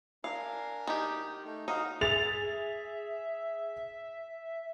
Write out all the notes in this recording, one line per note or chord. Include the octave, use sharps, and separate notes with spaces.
D4 A#4 F5 G#5
D#3 G4
A3 D#4
D#4 F#4 F5
G#4 E5 A6 F7